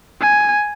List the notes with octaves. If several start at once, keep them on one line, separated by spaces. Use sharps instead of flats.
G#5